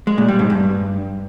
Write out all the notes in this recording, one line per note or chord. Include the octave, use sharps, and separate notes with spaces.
G#3
A#2
G3
G#2
G2